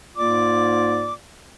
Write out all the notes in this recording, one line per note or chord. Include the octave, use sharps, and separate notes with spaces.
G#2 A#3 F4 D5 D6